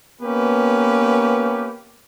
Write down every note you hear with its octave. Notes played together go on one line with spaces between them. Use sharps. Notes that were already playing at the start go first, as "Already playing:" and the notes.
A#3 B3 C#4 G4 B4